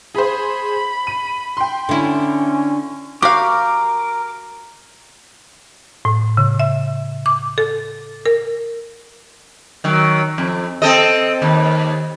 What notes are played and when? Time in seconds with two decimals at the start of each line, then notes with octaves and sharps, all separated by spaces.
0.15 G#4 C5 B5
1.07 D#7
1.57 G5 C6
1.89 D3 C#4 E4
3.22 F#4 G4 A#4 F5 D6
6.05 A2
6.37 C#3
6.60 E5
7.26 D6
7.58 A4
8.26 A#4
9.84 D#3 F#3
10.38 F2
10.82 C4 A4 D#5
11.42 D#2